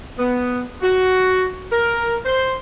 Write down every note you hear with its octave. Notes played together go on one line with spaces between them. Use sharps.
B3
F#4
A#4
C5